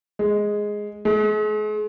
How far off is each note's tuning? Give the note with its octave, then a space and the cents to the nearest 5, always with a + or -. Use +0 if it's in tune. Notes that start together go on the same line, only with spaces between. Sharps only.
G#3 +0
G#3 +40